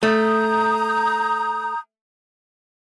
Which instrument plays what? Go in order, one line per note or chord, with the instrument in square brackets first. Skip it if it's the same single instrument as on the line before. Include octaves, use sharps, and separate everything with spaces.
[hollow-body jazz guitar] A3 [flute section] A#5 D#6 G6